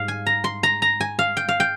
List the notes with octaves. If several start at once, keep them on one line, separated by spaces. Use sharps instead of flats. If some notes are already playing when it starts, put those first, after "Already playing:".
Already playing: G#2 G3 F5
G#5
A#5
C6
A#5
A#5
G#5
F5
G5
F5
G5